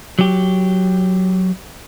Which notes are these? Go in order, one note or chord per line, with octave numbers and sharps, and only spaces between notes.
F#3 G4